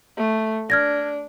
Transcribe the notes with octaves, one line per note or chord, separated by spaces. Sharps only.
A3
D4 F6 G#6 A#6